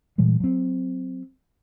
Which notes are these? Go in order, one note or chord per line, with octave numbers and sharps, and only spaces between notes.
A#2 E3 G3 G#3
F#3 C4